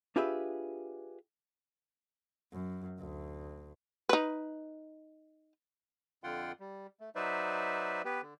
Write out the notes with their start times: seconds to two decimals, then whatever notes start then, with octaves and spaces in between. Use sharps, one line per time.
0.16 D4 F4 G4 G#4 B4 E5
2.52 F#2
2.99 D2
4.09 D#4 B4
6.24 F2 D3 F4 F#5 G5 C6
6.60 G3
7.00 A3
7.15 F#3 D#4 B4 C5 D5 E5
8.05 B3 G4 B4
8.22 D3